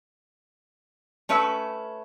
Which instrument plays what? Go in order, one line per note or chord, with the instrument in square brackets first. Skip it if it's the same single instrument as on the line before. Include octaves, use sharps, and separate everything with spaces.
[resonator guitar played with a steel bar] A3 C#4 B4 E5